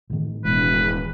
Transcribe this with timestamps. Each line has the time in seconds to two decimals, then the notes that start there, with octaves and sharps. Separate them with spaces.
0.10 A1 D#3
0.45 E1 B4